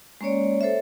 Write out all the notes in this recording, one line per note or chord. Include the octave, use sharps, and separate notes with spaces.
G#3 A#3 C#4 C#5 D5
A4 C5 C#5 E5